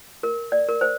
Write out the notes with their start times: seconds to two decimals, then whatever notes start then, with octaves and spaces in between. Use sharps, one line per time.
0.23 A#4
0.52 D5
0.69 A#4
0.81 C5